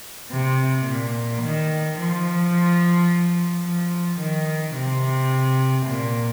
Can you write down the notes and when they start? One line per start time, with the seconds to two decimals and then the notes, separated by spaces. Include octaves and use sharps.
0.31 C3
0.86 A#2
1.43 D#3
1.98 F3
3.64 F3
4.20 D#3
4.75 C3
5.87 A#2